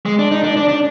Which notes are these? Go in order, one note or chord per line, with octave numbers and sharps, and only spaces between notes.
G#3
D4
D#4
D4
D4
D4